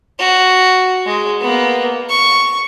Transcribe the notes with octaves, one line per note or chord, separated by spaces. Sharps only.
F#4
G#3
A#3 B3
C#6